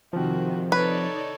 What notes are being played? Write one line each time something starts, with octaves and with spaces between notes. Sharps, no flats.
C3 D#3 F3 C4 F#4
D#4 A4 B4 C#5 D5